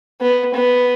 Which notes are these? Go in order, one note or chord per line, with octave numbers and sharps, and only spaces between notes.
B3
B3